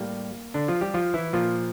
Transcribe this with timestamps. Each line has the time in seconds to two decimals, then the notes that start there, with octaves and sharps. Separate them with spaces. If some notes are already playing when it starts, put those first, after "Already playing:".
Already playing: A2 G3 A#3
0.54 D3 D4
0.68 F3 F4
0.81 G3 G4
0.94 F3 F4
1.14 E3 E4
1.33 A#2 F3 F4